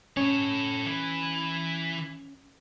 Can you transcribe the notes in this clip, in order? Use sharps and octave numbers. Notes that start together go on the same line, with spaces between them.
C#4 A4 C#5
E3